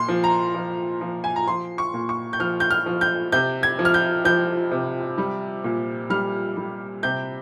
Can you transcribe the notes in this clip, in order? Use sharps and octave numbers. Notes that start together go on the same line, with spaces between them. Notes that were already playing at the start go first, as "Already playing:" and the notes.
Already playing: A#2 C6
F3
A#5
F3
F3
G#5
A#5
F3 C6
C#6
A#2
C#6
G6
F3 F6
G6
F6
F3
G6
C3 G6
G#6
F3
F6
G6
F3 G6
C3
G3
A#2
G3 F6
G3
C3 G6